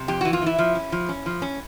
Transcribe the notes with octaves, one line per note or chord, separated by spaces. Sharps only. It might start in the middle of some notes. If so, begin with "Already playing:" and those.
Already playing: C3
F2 G4
E3 F#4
F4
E3 E4
F3
C#4
F3
C#4
F3
C#4